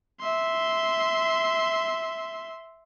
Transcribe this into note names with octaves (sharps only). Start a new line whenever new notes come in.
E5 C6